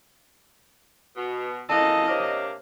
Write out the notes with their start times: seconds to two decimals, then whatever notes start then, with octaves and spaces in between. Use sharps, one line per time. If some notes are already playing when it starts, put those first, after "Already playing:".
1.16 B2
1.69 C#3 A#3 E4 A4 D#5 A5
2.08 C3 A#3 D4 C5 C#5 F6